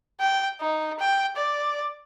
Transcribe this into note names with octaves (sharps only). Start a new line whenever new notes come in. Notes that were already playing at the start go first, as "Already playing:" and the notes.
G5
D#4
G5
D5